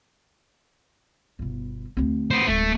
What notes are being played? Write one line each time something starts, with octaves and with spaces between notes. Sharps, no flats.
G1 B2
D2 C4
B3 C5
D1 G#3 A3